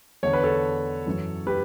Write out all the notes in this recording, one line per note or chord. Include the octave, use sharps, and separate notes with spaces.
E2 D3 C#5
B4
A4 C#5
F#2 E3
G4 B4